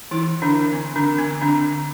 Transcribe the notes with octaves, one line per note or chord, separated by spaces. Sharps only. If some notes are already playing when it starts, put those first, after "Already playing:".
E3 E4
D3 D4
C4
D3 D4
C4
D3 D4